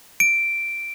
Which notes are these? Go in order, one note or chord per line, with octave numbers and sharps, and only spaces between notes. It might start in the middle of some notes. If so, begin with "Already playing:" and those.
D7